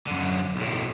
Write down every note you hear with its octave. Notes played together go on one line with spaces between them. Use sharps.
F#2 D3
B1 A2